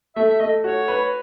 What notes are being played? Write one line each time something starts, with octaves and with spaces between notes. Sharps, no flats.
A3 E5
E5
A3 D#5
F#4 C#5
B4